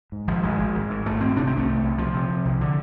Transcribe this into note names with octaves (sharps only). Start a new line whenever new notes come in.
G#2
G#1 F3
G#1 G#3
G#1
G#1
G#2
G#1 A3
G#1 C4
C3 D4
C4
C2
A3
C3
C2
C3 F3
C3
C3
C2
D3